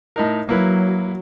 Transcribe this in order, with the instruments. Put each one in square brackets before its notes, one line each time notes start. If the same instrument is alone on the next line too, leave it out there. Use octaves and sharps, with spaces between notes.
[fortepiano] A2 D#4 A#4
[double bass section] F#3 [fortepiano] A#3 E4 B4